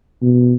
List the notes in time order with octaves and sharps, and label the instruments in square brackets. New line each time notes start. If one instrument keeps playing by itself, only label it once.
[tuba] B2